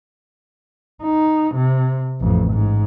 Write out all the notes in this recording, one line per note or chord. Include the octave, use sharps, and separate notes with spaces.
D#4
C3
A1 F2
G#2